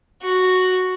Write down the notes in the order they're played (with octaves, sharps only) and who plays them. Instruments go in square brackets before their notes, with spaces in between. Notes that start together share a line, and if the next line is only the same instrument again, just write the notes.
[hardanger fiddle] F#4